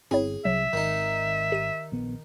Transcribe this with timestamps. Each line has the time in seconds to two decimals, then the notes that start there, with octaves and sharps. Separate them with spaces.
0.11 G1 C4 E4 G#4 C#5
0.45 C2 F#3 E5
0.73 G#1 D#3 D#4
1.52 G4 D#7
1.92 A#1 B3